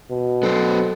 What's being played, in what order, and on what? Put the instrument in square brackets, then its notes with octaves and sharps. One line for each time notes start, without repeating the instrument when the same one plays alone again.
[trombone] B2
[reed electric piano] F#3 D4 A4 [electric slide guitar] B3 C5